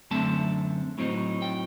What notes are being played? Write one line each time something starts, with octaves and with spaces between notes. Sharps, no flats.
F#2 D3 A3 C4 A5
A2 F#3 C4 D#4
G5